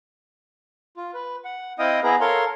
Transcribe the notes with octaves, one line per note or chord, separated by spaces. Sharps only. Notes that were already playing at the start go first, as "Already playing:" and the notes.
F4
B4
F#5
C4 E4 D#5 F5 G5 D#6
B3 E4 G#4 B4 A#5
A4 A#4 C#5 F5 C6